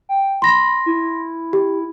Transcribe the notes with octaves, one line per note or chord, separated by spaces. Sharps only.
G5
B5 C6 A#6
E4
G4